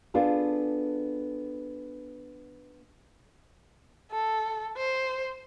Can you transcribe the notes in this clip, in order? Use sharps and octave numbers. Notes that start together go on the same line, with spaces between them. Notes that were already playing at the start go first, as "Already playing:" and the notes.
B3 D4 F4 G#4 A4
A4
C5